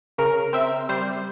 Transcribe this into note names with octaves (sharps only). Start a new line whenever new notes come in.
C#3 A#4
C4 E5
G3 C5